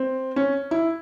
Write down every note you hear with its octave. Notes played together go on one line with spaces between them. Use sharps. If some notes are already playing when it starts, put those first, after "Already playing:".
Already playing: C4
C#4
E4